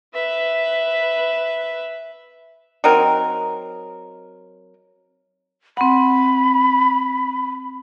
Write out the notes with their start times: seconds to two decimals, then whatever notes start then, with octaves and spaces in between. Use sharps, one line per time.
0.14 B4 E5
2.84 F#3 C4 D#4 A#4
5.77 C4 F#5 B5